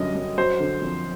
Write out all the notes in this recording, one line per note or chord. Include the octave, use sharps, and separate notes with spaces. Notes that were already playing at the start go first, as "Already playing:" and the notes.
Already playing: F#2 D3 G3 D#5
F#2
F#3 C5
D3
F2